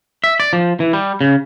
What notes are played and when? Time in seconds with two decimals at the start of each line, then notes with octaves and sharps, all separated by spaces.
0.24 E5
0.40 D5
0.53 F3
0.80 E3
0.93 G3
1.21 C#3